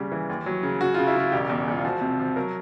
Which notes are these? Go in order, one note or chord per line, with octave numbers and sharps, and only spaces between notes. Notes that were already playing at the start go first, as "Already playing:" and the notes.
Already playing: D#2 C#3 G3 G4
E3
D#2
F#3
C#3
C#3 F#4
C#3 F4
E4
C#3 F4
E1 G4
E2
E2 F4
F3 F#4
C3
F3
F#3 A#4